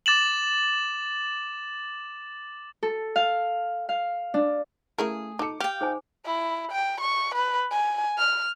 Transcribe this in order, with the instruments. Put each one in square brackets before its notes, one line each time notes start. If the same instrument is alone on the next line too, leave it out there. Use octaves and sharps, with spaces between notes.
[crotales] D6 A6 E7 F#7
[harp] A4
F5
F5
D4
[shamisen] C#3 E4 A#4 [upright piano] A3 [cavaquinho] G#4
[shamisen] D#4 A4 [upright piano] D6 C#7
[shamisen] G4 [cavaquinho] F5 G5
[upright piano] D#4 [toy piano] G#4 C5 G#5
[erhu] E4
G5
C#6
B4
G#5
F6